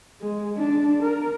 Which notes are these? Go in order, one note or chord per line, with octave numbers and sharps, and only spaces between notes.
G#3
D4
A#4